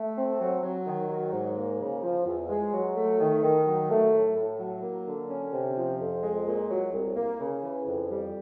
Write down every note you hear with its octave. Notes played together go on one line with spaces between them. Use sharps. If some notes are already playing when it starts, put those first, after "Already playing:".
Already playing: A3
C4
F#3
F#3
D#3
F#3
G#2
A#3
C#3
F3
E2
G#3
F#3
A3
D#3
D#3
F#3
A3
A2
A2
F#3
A#3
D3
C#4
C3
F3
F2
G#3
A#2
F#3
C2
A#3
C#3
E3
F2
G3